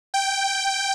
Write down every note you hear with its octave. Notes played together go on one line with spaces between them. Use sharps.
G5